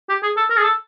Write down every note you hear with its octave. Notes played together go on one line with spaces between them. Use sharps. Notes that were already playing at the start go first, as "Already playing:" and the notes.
G4
G#4
A4
A#4
G#4
A4